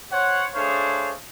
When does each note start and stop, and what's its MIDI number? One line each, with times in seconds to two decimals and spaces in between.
0.12 0.47 72
0.12 0.47 73
0.12 0.47 78
0.55 1.14 57
0.55 1.14 62
0.55 1.14 68
0.55 1.14 72
0.55 1.14 73
0.55 1.14 77